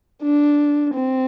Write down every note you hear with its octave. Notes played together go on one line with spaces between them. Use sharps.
D4
C4